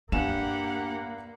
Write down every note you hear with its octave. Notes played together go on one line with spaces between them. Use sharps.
G2 A#3 D4 G4 F#5 G#5 E7